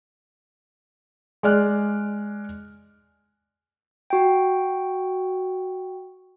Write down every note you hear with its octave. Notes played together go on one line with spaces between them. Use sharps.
G#3 D5 F6 F#6
F#4 G5